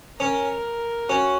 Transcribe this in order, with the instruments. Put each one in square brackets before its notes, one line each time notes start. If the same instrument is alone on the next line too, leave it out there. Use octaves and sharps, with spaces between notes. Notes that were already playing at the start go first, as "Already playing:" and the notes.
[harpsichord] C#4 [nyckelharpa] A#4
[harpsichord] C#4 [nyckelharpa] F#4